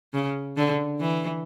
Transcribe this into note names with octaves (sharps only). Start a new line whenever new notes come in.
C#3
D3
E3